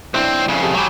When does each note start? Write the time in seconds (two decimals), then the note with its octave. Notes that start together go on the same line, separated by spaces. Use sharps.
0.14 B1 C4 D4 E4 C5
0.48 F2 C#3
0.61 G4 A4 G5
0.75 F#3 G4 G#5 B5